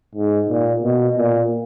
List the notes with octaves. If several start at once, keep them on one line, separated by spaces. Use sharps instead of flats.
G#2
A#2
B2
A#2